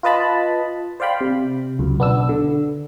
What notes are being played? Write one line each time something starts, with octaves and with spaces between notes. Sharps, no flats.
F4 B4 D#5 A5 B5
C5 D5 F5 G5 B5
C3
C#2 F#2
B1 B3 D4 E6
D3